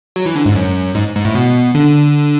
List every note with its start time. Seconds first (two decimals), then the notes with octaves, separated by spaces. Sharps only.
0.16 F#3
0.26 E3
0.36 D3
0.46 G#2
0.55 F#2
0.95 G#2
1.16 G#2
1.25 A2
1.35 B2
1.75 D3